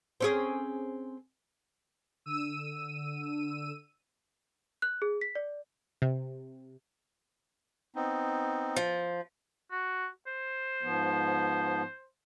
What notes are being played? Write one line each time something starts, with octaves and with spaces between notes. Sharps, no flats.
C4 C#4 G#4
D3 E6 D#7
F#6
G#4
B6
D5
C3
B3 C4 D#4
F3
F#4
C5
G#2 F3 B3